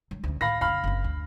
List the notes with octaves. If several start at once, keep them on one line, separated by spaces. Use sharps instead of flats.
F#3
D2 C#4
A2 F5 B5 A#6
F2 C#3 F5 B5 F6
F#1 C4
D2